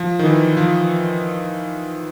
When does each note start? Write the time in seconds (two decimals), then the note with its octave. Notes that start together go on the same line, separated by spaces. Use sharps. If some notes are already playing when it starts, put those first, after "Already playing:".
Already playing: F3
0.19 D#3
0.25 E3
0.57 F3